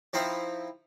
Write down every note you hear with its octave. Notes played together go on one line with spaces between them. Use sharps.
F3 C4 D#4 E4 C5 F5